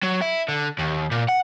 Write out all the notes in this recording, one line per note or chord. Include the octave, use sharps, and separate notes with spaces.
F#3
E4
D3
D#2
A#2
F#5